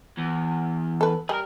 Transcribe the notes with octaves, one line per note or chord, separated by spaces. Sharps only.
E2
A4 B4
G3 G#4 A#4